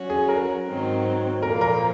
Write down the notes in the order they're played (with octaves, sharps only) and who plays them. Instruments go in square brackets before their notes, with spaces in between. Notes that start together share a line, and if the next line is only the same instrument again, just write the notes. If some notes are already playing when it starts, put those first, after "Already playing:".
Already playing: [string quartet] F#3 C#4 F#4
[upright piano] G#4
A#4
[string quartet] G#2 D#3 F#3 C4
[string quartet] A#2 F3 A#3 [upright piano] A#4
[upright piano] A#4